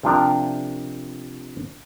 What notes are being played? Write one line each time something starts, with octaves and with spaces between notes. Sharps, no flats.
C3 F3 D4 A#4